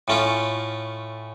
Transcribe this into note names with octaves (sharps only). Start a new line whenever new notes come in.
A2 A3 C#4 F4